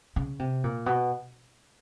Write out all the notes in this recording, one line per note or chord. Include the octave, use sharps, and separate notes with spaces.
C#3
C3
A#2
B2